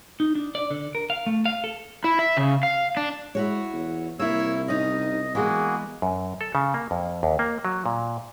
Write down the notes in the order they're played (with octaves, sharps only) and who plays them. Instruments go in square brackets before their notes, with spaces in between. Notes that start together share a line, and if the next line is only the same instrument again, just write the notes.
[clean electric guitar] D#4
D4
D5
D3
A#4
F5
A3
F5
A4
[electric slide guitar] E4
E5
C#3
F5
D4
[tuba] G#3 [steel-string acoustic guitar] E4 F#4 C#5
[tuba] E2
[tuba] C2 [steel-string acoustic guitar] A#3 E4 [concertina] C#5 E6
[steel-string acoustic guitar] C#4 D#4 [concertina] D#5
[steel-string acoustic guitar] E3 G#3 B3 [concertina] A#3 F#4 G#4
[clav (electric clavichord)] F#2
A4
C#3
A#3
F2
D#2
A#3
F#3
A#2